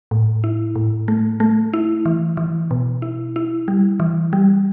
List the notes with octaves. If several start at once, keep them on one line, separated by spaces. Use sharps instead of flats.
A2
E4
A2
A3
A3
E4
E3
E3
B2
E4
E4
G3
E3
G3